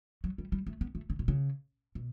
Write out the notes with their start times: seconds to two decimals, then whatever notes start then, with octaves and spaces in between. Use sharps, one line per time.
0.24 F#3
0.38 G3
0.52 G3
0.67 A3
0.81 B3
0.95 A3
1.10 C#3
1.19 B2
1.28 C#3
1.95 B2